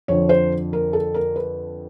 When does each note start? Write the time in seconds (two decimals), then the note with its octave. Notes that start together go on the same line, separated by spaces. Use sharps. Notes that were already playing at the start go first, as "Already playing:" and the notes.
0.08 F2 D3 F3 C#5
0.29 C5
0.73 A#4
0.93 A4
1.14 A#4
1.36 B4